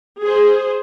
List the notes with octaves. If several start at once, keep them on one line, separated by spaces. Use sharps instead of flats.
G#4 C5